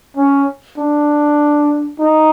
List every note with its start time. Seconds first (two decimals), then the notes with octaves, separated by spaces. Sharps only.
0.17 C#4
0.78 D4
1.99 D#4